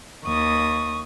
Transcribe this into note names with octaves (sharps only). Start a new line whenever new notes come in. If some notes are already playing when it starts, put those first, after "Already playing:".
D#2 C#6 D#6